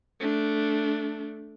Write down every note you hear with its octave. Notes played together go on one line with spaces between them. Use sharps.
A3 D4